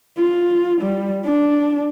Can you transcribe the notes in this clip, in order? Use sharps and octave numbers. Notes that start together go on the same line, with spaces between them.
F4
G3
D4